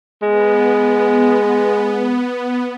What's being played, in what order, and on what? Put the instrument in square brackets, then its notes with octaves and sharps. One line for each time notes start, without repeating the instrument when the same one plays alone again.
[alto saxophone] G#3 [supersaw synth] B3